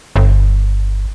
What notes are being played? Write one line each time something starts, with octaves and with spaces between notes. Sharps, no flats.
G1